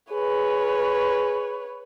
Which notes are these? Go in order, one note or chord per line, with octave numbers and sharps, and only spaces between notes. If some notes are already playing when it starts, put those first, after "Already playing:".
G#4 B4 C#5